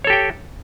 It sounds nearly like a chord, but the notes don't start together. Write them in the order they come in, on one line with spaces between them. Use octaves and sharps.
C#5 A4 G4 G5